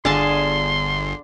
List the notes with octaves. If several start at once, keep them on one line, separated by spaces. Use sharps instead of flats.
G1 D3 G#4 F5 A5 C6